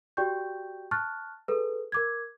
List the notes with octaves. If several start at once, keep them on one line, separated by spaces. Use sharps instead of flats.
F#4 G4 D5 G5 C#6 G6
A5 C#6 F6 F#6 A6
G#4 A4 B4
A#4 D6 G#6